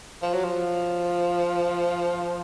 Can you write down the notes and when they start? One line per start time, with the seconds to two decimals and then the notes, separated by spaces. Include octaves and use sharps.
0.22 F3
0.33 F#3
0.44 F3